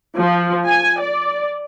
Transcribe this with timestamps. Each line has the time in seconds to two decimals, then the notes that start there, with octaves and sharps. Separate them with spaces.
0.18 F3
0.66 G#5
1.00 D5